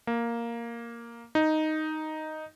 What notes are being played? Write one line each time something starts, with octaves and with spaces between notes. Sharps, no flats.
A#3
D#4